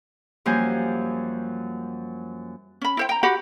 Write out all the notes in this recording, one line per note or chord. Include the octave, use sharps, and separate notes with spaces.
F#2 F3 G3 A#3 C5 G#5
C#4 B5
E4 C5 G5
G5 A#5
F#4 G4 F#5 B5